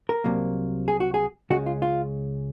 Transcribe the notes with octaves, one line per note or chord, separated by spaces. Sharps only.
A#4
C2 C3 F#3 A#3
G#4
F#4
G#4
C#2 C#3 G#3 C#4 F#4
F4
F4